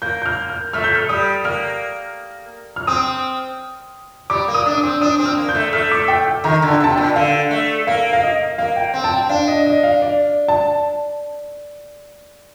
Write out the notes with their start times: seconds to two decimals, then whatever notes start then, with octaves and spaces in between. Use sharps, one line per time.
0.02 A#3 G6
0.22 G6
0.26 F6
0.49 F6
0.73 A3 F6
0.84 G6
0.95 F6
1.09 G3 D#6
1.44 A#3 F6
2.76 F6
2.87 C4 D#6
4.30 G3 D6
4.48 A#3
4.54 D#6
4.66 D4
4.77 D#6
4.83 C4
5.01 D4 D#6
5.19 C4
5.26 F6
5.38 A#3
5.49 G6
5.55 A3
5.73 A3 F6
5.91 D6
6.08 G5
6.27 G5
6.44 D#3 A#5
6.62 D3
6.68 A5
6.80 C3 A5
6.92 G5
6.98 A#2
7.16 D3 F5
7.51 A3
7.87 A#3 F5
8.13 F5
8.23 D#5
8.58 A#3 F5
8.76 G5
8.94 C4
9.04 A5
9.13 G5
9.29 D4 F5
9.48 D#5
9.66 D#5
9.83 F5
10.02 D5
10.48 A5